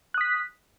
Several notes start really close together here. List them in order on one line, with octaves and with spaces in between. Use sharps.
F#6 D#6 B6